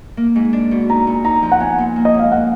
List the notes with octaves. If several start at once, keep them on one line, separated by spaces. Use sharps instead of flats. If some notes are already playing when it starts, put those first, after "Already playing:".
A#3
G#2
D4
B2
D#4 A#5
A#2
D#4 A#5
F3
F#5
B3 G#5
A#2
A#3
D#5
G#2
F5
A#3 F#5